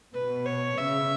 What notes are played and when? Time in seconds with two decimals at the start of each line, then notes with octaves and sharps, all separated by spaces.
0.14 B2 B4
0.46 C#5
0.78 C#3 E5